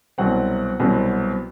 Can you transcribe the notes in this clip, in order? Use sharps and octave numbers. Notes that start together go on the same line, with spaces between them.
C2 B2 F#3 C4 F#5
C2 B2 F#3 C4